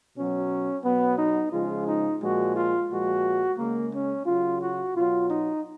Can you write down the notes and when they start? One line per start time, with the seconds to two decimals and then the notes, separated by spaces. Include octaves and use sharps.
0.16 B2 F#3 C#4
0.84 B2 F#3 B3
1.19 D#4
1.53 C#3 F3 G#3 F4
1.87 D#4
2.21 A#2 F3 G#3 F#4
2.55 F4
2.90 A#2 F3 G#3 F#4
3.58 C#3 G#3 A#3
3.92 C#4
4.26 C#3 F#3 F4
4.61 F#4
4.95 B2 F#3 F4
5.29 D#4